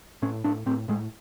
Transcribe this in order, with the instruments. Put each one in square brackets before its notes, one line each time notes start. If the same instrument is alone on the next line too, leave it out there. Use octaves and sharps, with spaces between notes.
[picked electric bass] A2 C#4
A2 D4
A2 C4
A2 G#3